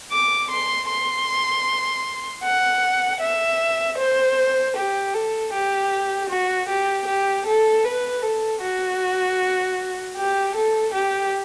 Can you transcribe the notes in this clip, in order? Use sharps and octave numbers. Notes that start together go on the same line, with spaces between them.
D6
C6
C6
F#5
E5
C5
G4
A4
G4
F#4
G4
G4
A4
B4
A4
F#4
G4
A4
G4